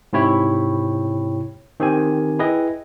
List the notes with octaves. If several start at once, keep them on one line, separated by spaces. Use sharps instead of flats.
G#2 C3 E4 C#5 G5 B5
D#3 C4 G4 G#5
E4 G#4 B4 D#5 G5